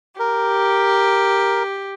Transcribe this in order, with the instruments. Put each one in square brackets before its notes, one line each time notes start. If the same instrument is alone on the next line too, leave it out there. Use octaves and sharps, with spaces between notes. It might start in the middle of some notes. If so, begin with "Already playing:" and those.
[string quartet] G4 [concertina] A#4